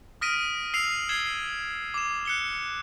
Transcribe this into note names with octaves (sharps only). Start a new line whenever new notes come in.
D#6 F6 A#6 B6 D7 D#7
E6 C7 D#7 F7
G#6 C7 E7 F#7 G7
D6 E7
F#6 C#7 G7